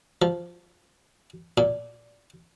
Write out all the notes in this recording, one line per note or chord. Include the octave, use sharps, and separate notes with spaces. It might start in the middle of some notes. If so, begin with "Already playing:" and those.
F3
A#2